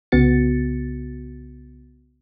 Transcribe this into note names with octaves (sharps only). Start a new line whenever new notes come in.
C2 C#3 B3 F#4 A6 C#7